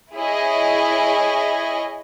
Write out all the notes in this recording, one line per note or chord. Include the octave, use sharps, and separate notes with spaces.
E4 G#4 C#5 D#5